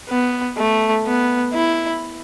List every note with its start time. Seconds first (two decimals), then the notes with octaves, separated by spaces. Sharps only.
0.09 B3
0.57 A3
1.05 B3
1.54 E4